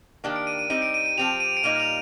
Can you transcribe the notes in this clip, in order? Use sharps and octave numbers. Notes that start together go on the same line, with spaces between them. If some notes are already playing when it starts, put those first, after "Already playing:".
D#3 A#3 D4 G4
D7
D#7
D#7
G3 C4 D#4 D#7
D7
D#7
D#7
F3 C4 G4 F7
D#7
D7
A#2 G3 A#3 D#4 D#7
F7